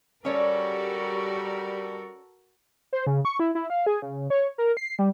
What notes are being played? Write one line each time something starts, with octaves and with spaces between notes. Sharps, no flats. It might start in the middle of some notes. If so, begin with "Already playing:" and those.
G3 C#4 F#4 A4 A#4 C#5 D5
C5
C#3
C#6
E4
E4
F5
G#4
C#3
C#5
A#4
C7
G3